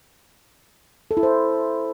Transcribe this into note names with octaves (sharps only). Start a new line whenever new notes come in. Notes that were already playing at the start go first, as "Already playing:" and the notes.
A4
E4
C5